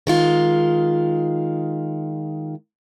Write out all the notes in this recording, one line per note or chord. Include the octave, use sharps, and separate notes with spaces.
D#3 G#3 F4